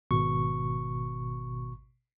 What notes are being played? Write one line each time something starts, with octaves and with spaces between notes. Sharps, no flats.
G#1 B2 C#6